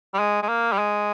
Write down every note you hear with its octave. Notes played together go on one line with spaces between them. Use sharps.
G3
G#3
G#3
A#3
G3
G#3